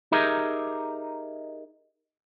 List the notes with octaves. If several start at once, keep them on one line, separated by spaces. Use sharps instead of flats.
D#4 G4 G#4 A#4 D#5 E5